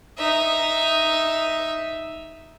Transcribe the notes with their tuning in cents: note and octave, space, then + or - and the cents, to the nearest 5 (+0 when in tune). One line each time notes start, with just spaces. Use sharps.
D#4 +0 E5 +0